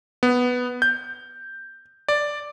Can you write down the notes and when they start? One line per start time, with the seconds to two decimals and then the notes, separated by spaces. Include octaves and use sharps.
0.23 B3
0.82 G6
2.08 D5